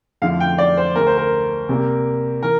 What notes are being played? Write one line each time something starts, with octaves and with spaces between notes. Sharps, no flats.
F2 D3 F3 A3 E4 F5
G5
D5
C5
D2 D3 A3 A#4
C5
A#4
C3 G3 A#3
E3 A#4